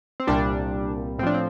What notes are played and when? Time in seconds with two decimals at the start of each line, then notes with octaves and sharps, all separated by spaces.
0.20 C4
0.27 C2 A#2 G3 D4
1.18 A2 C4
1.23 F3 D4
1.34 C4